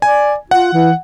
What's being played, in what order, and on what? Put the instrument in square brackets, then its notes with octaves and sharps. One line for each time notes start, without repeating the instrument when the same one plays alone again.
[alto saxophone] D5 [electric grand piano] G#5
[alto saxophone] F4 [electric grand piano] F#5
[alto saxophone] E3